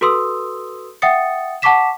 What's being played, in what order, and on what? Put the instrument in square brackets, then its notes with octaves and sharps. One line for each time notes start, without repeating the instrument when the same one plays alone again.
[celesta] F#4 A4 B4 C6 D#6 E6
E5 F#5 G5 D#6 A6 C#7
F#5 A5 C#6 D6 B6 E7